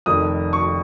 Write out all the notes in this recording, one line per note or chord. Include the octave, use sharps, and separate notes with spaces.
F1 F2 D#3 D#6
C#6